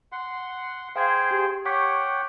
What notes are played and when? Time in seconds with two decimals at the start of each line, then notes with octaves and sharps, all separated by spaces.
0.12 F#5 C6
0.96 G#4 C5 F5 G5 G#6
1.31 G4
1.65 C#5 F#5 G5 C#6 D6 B6